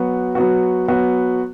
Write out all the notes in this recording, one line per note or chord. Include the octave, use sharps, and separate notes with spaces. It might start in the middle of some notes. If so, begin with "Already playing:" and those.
Already playing: F#3 B3 F#4
F#3 B3 F#4
F#3 B3 F#4